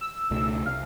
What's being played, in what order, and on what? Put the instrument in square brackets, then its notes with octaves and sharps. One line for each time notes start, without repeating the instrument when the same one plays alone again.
[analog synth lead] E6
[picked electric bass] C#2 B2 A3
[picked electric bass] C2 [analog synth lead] F5